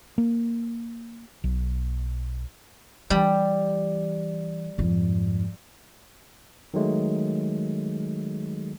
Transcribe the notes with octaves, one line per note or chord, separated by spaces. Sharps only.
A#3
B1
E3 G3
F2 G#2
D#3 F#3 G#3 A3